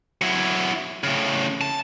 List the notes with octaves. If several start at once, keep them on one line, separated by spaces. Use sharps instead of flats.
F#3 E4
A2 C#3
A5